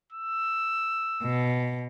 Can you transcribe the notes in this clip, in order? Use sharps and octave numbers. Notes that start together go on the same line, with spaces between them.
E6
B2